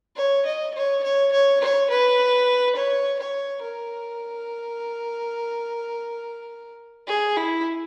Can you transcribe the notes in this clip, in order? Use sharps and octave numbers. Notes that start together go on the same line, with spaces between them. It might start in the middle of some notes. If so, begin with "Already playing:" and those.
C#5
D#5
C#5
C#5
C#5
C#5
B4
C#5
C#5
A#4
G#4
E4